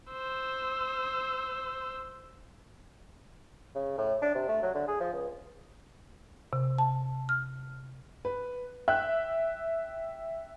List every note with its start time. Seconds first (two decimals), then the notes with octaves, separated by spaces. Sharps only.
0.11 C5 E6
3.75 C#3
3.98 A2
4.22 D4
4.35 C3
4.49 A3
4.62 F#3
4.75 D3
4.88 G#4
5.00 F3
5.13 C#2
6.53 C3
6.78 A5
7.29 F6
8.25 B4
8.88 E5 G5 F#6